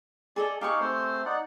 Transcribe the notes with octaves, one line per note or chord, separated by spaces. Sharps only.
G#4 A4 D5 D#5
D#4 G4 G#4 F5 C#6
A3 C4 C5
D#4 D5 F#5